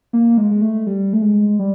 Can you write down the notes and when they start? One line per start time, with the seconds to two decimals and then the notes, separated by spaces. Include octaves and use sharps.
0.13 A#3
0.38 G#3
0.51 G#3
0.61 A3
0.87 G3
1.13 A3
1.22 G#3
1.59 G3